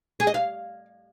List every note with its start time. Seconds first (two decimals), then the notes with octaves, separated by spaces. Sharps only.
0.20 G#4
0.27 D#5
0.34 F5